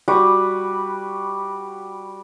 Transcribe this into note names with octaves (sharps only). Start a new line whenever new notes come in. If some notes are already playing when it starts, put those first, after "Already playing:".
G3 F#4 B4